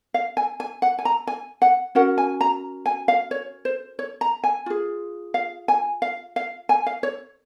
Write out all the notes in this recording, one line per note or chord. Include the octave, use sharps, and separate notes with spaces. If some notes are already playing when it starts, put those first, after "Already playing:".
F5
G#5
G#5
F#5
G#5
A#5
G#5
F#5
C#4 F#4 A#4 F#5
G#5
A#5
G#5
F5
C#5
C5
C#5
A#5
G#5
F4 G#4
F5
G#5
F5
F5
G#5
F5
C#5